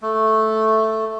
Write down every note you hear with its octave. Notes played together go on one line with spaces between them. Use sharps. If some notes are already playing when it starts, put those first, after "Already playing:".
A3